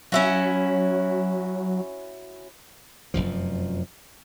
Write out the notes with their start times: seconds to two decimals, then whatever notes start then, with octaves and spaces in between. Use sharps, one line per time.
0.12 F#3 C#4 E4 F#4
3.14 F1 B1 F#2 F3